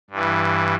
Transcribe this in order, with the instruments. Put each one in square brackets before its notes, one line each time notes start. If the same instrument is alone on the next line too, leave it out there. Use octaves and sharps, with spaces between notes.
[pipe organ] G2 E3